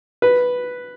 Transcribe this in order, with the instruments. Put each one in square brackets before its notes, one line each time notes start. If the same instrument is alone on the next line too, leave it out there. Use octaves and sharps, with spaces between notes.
[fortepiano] B4